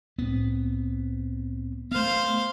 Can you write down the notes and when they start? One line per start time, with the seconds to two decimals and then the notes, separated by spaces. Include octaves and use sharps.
0.19 C2 A2 B3 C4
1.92 A3 B3 C5 F5